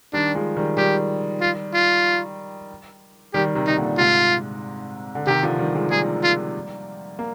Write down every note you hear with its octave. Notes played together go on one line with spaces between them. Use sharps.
D#3 G3 D4
F3 G#3
D#3 G3
D#3 G3 G4
F4
F4
D#3 G3 G4
C3 D#3
C3 D#4
A#2 D3
G#2 C3 F4
D3
C3 D#3 G4
D3 F3
D#3 G3
F3 G#3
G3 A#3 G#4
F4
A#3